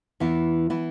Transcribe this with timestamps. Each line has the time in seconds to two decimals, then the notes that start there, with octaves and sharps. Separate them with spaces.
0.20 E2 E3 B3 E4
0.70 E3 B3 E4